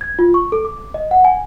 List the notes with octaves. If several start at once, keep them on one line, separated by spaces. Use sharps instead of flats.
G#6
F4
C#6
A4
D6
D#5
F#5
G#5